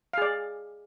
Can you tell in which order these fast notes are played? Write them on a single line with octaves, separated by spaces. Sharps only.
F5 G#4 D5